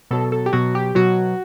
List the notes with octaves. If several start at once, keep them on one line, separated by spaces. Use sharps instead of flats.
B2 F#3 A4
A4
G4
B2 F#3 F#4
G4
B2 F#3 F#4